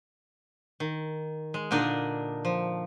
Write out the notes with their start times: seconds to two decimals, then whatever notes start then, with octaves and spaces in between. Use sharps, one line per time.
0.80 D#3
1.54 G#3
1.71 A#2 D3 D4 D#4 A#4 D#5
2.45 F3